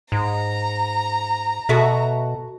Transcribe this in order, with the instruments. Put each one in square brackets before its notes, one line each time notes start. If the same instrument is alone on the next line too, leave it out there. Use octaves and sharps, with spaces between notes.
[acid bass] G#2 [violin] A#5
[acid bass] B2 [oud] F#4 A4 E5